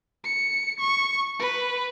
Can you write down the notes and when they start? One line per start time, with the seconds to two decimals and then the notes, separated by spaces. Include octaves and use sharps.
0.24 C#7
0.79 C#6
1.39 B4